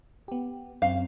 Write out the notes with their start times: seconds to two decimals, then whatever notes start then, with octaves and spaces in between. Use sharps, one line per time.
0.28 B3 G4
0.82 F#2 C4 F5